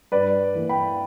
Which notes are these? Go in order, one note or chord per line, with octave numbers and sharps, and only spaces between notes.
G2 B4 D5
E3 A#3
G5 B5